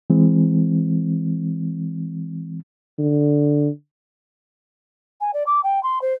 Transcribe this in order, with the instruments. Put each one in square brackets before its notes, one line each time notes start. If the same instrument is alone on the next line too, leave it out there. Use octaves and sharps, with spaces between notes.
[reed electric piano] E3 G#3 C4
[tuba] D3
[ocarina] G#5
D5
D6
G5
C6
C5